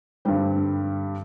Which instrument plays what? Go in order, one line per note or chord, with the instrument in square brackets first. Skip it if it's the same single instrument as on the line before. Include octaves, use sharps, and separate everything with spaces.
[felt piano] G2 D3 G3 C4